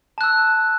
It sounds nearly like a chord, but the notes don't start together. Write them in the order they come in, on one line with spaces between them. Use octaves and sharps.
A5 F#6 E6